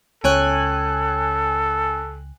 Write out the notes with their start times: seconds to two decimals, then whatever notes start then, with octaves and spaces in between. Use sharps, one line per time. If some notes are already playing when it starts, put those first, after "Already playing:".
0.24 C#2 C#4 A4 C#5 G5 G#5 F#6